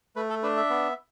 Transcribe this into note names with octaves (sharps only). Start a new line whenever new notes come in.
A3 B4
A4
D4 B4
E5
B3